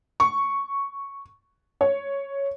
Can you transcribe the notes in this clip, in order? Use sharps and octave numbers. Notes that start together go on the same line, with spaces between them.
C#6
C#5